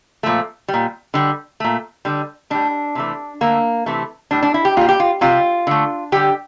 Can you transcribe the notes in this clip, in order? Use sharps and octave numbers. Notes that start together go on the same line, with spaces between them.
A#2 F3 A3
G3
A#2
D3 G3
A#2 A3
D3 G3
A2 G3 D4
C3 E3 A3
D3 A3 A#3
C3 E3 A3
A2 G3 D4
D4
E4
G4
A#2 G3 F4
G4
F4
C3 G3 F4
D3 A3
D3 G3 G4